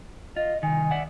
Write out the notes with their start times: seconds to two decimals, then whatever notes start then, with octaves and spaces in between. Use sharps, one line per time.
0.36 F4 D#5
0.63 C2 D#3 G#5
0.91 D5 E5 F#5